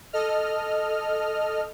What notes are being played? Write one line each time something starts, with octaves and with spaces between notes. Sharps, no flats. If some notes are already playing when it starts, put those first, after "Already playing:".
A4 D#5 F6